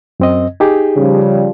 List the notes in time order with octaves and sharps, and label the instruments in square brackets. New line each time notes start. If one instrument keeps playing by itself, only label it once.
[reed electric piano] F#2 C4 D#5
D#4 G4 G#4
[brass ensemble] C#3 F3 G3